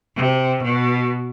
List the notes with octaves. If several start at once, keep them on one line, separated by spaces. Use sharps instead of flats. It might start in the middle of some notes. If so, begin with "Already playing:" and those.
C3
B2